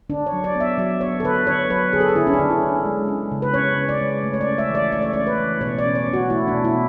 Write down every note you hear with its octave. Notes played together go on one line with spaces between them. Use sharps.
D3 D4
C#5
F#3
D5
B3 E5
F#3 D5
B3 C#5
A4
D3 B4
D3 C#5
F#3 B4
D3 G#4
A4
G#4
D3 E4
C#4
D4
D3
E4
D3
G#3
C#4
C#3
B4
C#4 C#5
C#4
D5
G#3
A3
C#5
D5
C#4
E5
E3
D5
A3 D5
C#5
C#4 D5
B4
E3
B2 C#5
D5
C#4
C#5
C#4
F#4
A3 E4
B2 D4
E4